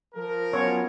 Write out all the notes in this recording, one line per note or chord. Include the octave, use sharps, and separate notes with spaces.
F3 A#4
F#3 B3 C#4 F4 C#5